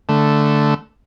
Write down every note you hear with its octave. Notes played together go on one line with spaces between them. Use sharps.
D3 A3